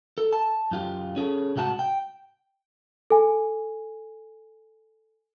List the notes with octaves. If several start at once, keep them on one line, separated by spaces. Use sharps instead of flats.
A4
A5
F#2 F4 G4
C#4 G#4 A4
C2 G#2 F#4 F#5 A5
G5
A4 G#5